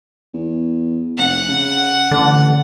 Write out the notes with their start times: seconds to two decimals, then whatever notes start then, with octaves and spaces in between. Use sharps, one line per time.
0.34 E2
1.18 F1 F#5
1.48 C#3
2.11 A1 D3